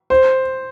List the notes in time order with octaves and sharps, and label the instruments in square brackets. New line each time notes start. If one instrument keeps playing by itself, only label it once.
[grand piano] C5